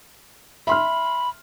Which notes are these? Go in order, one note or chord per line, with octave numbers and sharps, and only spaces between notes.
E5 B5 C6 F6